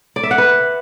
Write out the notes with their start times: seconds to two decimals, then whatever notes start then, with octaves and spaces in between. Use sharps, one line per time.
0.16 D5
0.23 E5
0.31 F#5
0.38 B4